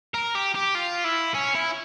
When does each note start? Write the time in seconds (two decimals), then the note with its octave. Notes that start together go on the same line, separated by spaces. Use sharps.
0.14 A#4
0.35 G4
0.55 G4
0.75 F4
1.04 E4
1.34 C#4
1.55 E4